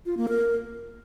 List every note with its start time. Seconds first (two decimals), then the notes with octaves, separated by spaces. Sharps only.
0.06 F4
0.17 A#3
0.29 A#4